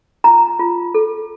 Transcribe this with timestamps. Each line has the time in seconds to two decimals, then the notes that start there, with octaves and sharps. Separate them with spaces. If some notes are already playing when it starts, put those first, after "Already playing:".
0.24 F4 A#5
0.59 F4
0.95 A4